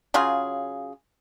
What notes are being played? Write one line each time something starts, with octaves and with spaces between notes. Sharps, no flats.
C#3 F#3 F4 G#4